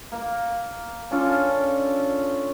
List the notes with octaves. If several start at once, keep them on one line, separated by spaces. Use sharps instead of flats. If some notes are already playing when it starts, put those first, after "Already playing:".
A#3
C#4 D4 F4 A4